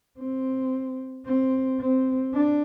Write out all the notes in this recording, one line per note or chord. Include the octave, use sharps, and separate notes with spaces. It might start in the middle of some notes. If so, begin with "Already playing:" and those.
C4
C4
C4
D4